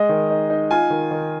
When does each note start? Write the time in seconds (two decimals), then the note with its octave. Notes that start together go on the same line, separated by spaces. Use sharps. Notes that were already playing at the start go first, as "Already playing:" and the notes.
Already playing: G#3 D#5
0.09 D#3
0.30 D#4
0.50 D#4
0.71 F4 G#5
0.90 D#3
1.11 D#3